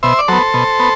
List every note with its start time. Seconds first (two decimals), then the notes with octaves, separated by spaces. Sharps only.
0.03 B2 C5 E5
0.19 D5
0.28 F#3 B3 A4 C5
0.54 B2
0.79 B3